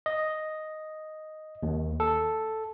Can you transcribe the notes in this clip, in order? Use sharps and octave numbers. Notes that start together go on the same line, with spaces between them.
D#5
D#2
A4